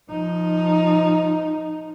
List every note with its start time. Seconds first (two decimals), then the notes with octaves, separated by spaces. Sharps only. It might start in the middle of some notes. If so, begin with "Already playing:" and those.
0.10 F3 D#4